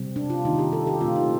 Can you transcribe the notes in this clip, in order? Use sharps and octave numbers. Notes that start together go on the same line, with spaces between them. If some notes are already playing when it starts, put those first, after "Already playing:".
Already playing: C3 G3 C4
D4
F4
D#3 A#3 D#4
G4
A4
G4
A#2 A3 C4 F4
D#4